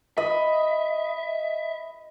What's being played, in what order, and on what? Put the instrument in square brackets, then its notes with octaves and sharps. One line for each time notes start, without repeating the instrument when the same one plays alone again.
[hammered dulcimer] D#5 B5 [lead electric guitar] E5